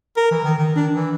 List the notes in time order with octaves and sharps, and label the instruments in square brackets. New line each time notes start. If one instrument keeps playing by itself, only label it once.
[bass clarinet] A#4
E3
D#3
D#3
D4
E3